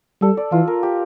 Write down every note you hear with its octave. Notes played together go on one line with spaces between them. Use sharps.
G3 A4
D5
E3 F4
A#4
G4